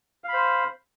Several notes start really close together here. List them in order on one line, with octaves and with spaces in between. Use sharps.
F5 B5 C5